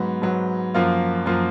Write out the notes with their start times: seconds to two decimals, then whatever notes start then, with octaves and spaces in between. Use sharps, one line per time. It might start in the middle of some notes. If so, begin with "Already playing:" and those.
Already playing: G#2 F#3 B3
0.22 G#2 F#3 B3
0.74 F#2 F3 A#3 F4
1.26 F#2 F3 A#3 F4